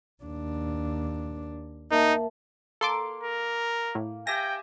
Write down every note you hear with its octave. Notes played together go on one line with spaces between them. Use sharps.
D#2 D4
A#3 D#4 A#4 E5 A5
A#3 A4 C6 D6
A#4
A2
G4 E5 G5 G#5 A#6